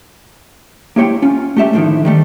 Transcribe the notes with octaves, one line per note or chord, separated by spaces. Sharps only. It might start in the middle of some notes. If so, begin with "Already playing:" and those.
A#3 E4 G4 C#5 G5 C6
C#4 F4
A3 G4 E5
A2 D3 D#3 F3
D#3 G3 A3